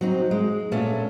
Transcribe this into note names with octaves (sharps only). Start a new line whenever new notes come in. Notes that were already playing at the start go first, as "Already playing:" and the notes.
F#3 C4 D#4
G#3
A#2 A3 C#4 D4